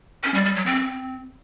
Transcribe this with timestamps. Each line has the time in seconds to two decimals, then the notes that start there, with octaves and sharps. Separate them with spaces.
0.24 C#4
0.34 G3
0.45 G3
0.55 F#3
0.66 C4